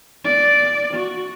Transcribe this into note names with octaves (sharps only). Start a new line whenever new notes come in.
D5
F#4